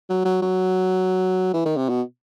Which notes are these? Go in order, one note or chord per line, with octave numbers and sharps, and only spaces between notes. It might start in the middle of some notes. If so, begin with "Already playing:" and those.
F#3
F#3
F#3
E3
D#3
C3
B2